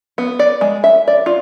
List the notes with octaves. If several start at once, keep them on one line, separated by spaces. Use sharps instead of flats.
B3
D5
G#3
E5
D5
F4